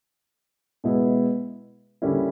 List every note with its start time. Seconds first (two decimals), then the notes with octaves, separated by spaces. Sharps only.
0.84 B2 G#3 B3 E4
2.02 D3 G3 A#3 C#4 E4